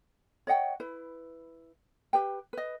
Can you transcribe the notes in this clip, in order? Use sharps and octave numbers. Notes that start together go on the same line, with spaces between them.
C#5 D#5 F#5 G5
E4 B4
G4 B4 G5
B4 D#5